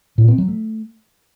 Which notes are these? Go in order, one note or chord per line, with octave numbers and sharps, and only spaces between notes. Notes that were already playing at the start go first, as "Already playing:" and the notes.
A#2
C4
F#3
A3